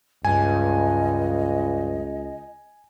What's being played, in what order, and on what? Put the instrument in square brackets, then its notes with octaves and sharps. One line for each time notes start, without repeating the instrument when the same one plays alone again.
[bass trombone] C#2 [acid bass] G2 [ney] D#5 [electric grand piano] G#5